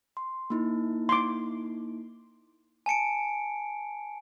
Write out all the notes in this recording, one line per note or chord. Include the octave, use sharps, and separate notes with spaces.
C6
A#3 D#4 E4
C6 D6
G#5 A5 C#7 D7